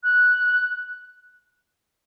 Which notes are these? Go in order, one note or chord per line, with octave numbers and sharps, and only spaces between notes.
F#6